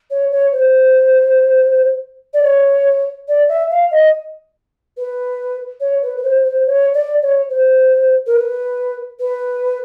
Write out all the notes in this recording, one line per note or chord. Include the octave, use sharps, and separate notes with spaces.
C#5
C#5
C5
D5
C#5
D5
E5
F5
D#5
B4
C#5
B4
B4
C5
C5
C#5
D5
C#5
C5
A#4
B4
B4